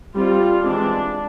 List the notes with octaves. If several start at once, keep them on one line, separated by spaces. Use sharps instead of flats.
G3 C4 F4
E3 G#3 C4 D4